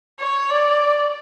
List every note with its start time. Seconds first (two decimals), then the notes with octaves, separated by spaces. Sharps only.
0.19 C#5
0.51 D5